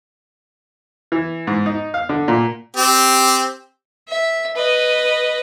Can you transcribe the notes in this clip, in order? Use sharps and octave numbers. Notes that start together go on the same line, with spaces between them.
E3
G#2
D#4
F5
D3
A#2
C4 G4
E5
B4 D#5